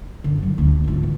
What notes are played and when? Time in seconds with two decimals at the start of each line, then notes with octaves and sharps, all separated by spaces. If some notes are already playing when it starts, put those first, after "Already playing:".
0.24 F#2 D3
0.42 F#3 E4
0.58 D2 C#4
0.84 G#2 F4
1.03 E3